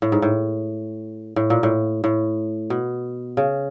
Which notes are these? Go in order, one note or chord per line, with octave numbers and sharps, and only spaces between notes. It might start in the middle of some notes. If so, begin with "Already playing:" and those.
A2
G#2
A2
A2
A#2
A2
A2
B2
C#3